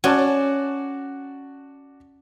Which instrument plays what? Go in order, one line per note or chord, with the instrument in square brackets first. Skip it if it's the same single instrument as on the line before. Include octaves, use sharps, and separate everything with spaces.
[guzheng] C#4 [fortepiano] F#4 D5 A5